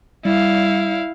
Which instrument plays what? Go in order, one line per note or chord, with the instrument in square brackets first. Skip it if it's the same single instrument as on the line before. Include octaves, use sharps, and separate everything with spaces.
[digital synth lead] G3 [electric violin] E4 F5